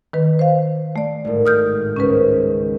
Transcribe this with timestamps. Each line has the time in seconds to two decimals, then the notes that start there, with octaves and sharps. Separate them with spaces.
0.13 D#3 B4
0.39 C5 F5
0.96 A3 D5
1.25 G#1 A2
1.46 D#6 F6 G6
1.96 G#1 C#2 C#4 B4 C5